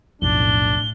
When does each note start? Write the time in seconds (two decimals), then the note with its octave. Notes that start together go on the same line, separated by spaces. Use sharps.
0.22 B1 F2 A2 D4 G7